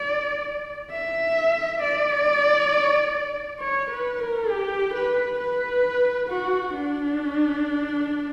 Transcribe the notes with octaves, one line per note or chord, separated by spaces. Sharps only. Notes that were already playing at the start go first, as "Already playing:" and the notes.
Already playing: D5
E5
D5
C#5
B4
A#4
G4
B4
B4
F#4
D4